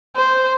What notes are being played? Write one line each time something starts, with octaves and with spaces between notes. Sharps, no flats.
C5